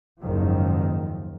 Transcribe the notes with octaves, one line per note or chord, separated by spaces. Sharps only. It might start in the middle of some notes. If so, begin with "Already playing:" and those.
F#1 D#2 G#2 D#3 F3